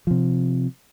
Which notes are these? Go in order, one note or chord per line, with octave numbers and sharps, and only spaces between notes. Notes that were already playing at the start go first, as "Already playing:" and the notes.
C3 F3